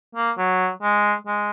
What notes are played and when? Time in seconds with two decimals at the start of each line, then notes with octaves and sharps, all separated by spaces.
0.15 A#3
0.38 F#3
0.82 G#3
1.27 G#3